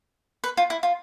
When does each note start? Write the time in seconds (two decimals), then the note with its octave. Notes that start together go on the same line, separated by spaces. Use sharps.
0.44 B4
0.57 F4
0.70 E4
0.83 F4